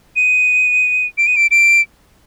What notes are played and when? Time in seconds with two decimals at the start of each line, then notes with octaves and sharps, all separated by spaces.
0.16 D#7
1.18 D7
1.27 D#7
1.36 D7
1.51 D7